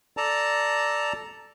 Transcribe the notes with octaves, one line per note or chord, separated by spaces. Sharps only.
A4 D5 A5 A#5